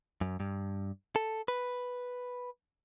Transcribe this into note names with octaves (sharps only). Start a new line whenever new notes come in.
F#2
G2
A4
B4